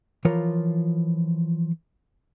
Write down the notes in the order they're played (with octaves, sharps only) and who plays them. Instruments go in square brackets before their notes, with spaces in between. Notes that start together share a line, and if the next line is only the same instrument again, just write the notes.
[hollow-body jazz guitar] E3 F3 F4 A#4 C#5